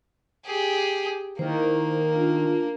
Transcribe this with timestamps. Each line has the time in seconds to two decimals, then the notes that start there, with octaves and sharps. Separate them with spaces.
0.45 G4 G#4
1.39 D#3 A#3 E4 C5
2.15 D4 F4